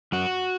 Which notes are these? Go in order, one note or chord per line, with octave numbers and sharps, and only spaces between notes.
F#2 F#4